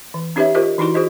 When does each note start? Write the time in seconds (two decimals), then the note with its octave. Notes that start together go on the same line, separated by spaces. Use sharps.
0.14 E3
0.36 C#4 D#4 G4 B4 C#5 E5
0.54 F4 G4 A#4 C5 D#5
0.78 E3 D#4 E4 F#4 C6
0.94 F#4 G#4 C5 D#5